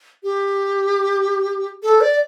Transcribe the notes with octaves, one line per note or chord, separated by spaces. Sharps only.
G4
A4
D5